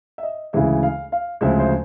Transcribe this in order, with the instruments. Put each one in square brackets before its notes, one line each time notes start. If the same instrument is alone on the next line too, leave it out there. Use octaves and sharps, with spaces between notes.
[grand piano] E5
D#5
D2 C#3 E3 G#3 E5
F5
F5
D2 C#3 F3 G#3 E5
C5